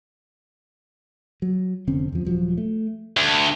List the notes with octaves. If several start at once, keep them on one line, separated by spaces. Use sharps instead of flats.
F#3
F1 D3 C4 C#4
E2 F3
D#1 F3 F#3
A3
D2